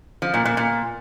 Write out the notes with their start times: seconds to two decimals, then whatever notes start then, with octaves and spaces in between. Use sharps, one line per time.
0.22 F3
0.34 A#2
0.45 A#2
0.57 A#2